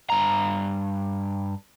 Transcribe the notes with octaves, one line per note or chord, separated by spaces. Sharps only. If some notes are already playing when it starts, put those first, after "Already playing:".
G2 A#5